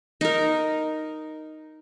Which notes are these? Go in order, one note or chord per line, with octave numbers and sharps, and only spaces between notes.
D#4 A#4